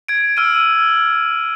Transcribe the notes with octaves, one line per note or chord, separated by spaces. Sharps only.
G#6 D7
E6 F6 D#7